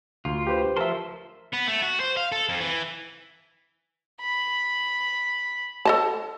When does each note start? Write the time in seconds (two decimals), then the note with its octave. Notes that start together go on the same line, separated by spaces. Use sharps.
0.25 D2 F4
0.47 G4 B4 C5
0.77 F3 A#4 E5 A5 C6
1.53 B3
1.67 A3
1.82 F#4
2.00 C5
2.17 F5
2.32 A4
2.49 F2
2.61 E3
4.21 B5
5.85 A4 D#5 A5